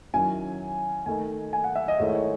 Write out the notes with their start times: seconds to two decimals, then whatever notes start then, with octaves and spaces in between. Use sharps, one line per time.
0.13 D#3 F#3 C#4 E4 G#5
1.06 D#3 A3 D#4 G#5
1.53 G#5
1.64 F#5
1.75 E5
1.88 D#5
1.99 G#2 D#3 A3 E4 C#5
2.15 C#5